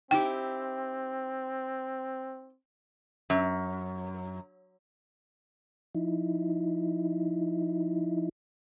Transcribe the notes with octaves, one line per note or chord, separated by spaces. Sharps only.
C4 D#4 E4 G4 G5
F#2
F3 D#4 E4